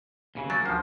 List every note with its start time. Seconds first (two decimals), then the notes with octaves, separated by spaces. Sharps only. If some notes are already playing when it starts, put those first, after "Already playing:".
0.35 D#2 C#3 E3
0.50 F#3 A#3 C#4 A6
0.66 D2 F3 C5 F6